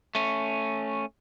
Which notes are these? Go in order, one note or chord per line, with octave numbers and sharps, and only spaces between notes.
A3 C#4